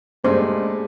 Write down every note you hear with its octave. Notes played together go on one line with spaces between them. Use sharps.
G2 A#2 G#3 A3 C5